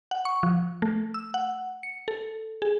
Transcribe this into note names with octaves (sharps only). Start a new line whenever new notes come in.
F#5
C#6
F3
A3
E6
F#5
C#7
A4
G#4